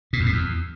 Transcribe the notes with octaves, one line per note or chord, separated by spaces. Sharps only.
A#2
E2
A2
E2